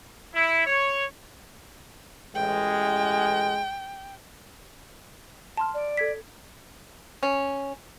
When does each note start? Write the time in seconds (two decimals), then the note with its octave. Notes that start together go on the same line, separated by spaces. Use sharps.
0.34 E4
0.67 C#5
2.35 A1 G#3 G5
5.57 A5 C6 F6
5.74 D5
5.97 A4 G#6 B6
7.23 C#4